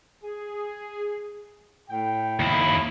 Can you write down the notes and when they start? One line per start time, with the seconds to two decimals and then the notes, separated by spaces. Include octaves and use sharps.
0.24 G#4
1.90 A2 G5
2.40 D#2 E4